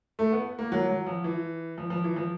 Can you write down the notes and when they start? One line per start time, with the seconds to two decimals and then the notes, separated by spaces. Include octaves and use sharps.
0.19 A3
0.32 B3
0.59 A#3
0.72 F#3
0.89 F#3
1.07 F3
1.24 E3
1.78 F3
1.90 F3
2.04 E3
2.16 F3